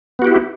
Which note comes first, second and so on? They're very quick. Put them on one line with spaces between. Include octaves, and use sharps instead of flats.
B3 F#4 G4 E4